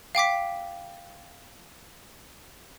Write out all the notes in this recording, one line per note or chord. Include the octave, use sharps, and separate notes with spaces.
F5 G5 D6 B6